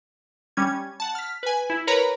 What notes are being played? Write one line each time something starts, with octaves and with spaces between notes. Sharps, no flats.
G3 C#4 G#6
F#5 A5
F6 B6
B4 G#5
E4
A#4 B4 C#5 A#5 B5